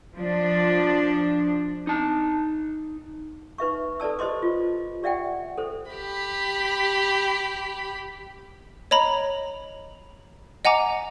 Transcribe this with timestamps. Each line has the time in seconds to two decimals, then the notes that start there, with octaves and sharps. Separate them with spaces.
0.17 F3 D4
1.87 D#4 A5
3.58 D#4 B4 E5 C#6
4.00 A4 B4 D5 A5 E6
4.19 G4 C5 D#5 C6 D6
4.43 F4
5.03 G4 D5 E5 F#5 G5
5.57 A4 C5
5.91 G4 B5
8.91 C#5 D#5 A#5 B5
10.65 D#5 F#5 G#5 A#5 D6